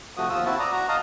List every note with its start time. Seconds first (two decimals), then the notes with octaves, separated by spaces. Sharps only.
0.17 C3 F3 A3 F#4 D#6
0.30 D#2 F3 F4 D#6 E6
0.46 C4 E4 F#4 E5 A5
0.59 D5 A#5 D#6
0.72 F#4 A#5
0.89 D#5 F5 A5 A#5 D#6